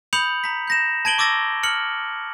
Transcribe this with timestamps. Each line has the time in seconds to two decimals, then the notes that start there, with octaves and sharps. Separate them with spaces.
0.13 B5 D#6 G6 C#7 F7 F#7
0.44 A#5 B6
0.68 G6 A#6 E7
1.05 A5 G#6 D7 F#7 G7
1.18 C#6 D6 E6 A6 A#6
1.63 F6 C#7 F#7